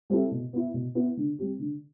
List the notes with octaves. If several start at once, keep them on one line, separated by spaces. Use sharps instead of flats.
G3 C4 E4 A4
B2
B3 E4
B2
B3 E4
D3
G3 C4 G4
D3